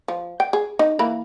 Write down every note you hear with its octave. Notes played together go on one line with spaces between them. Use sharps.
F3
G5
G#4
D#4
E3 A#3 B5